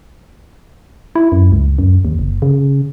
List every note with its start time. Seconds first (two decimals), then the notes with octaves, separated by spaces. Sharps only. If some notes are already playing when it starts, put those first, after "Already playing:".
1.15 E4
1.32 F#2
1.52 C#2
1.79 F#2
2.05 D#2
2.19 F#1
2.42 C#3